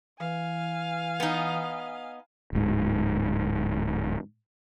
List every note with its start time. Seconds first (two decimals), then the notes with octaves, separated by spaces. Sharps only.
0.20 E3 F5 G#5
1.20 B3 D#4
2.53 D1 G#2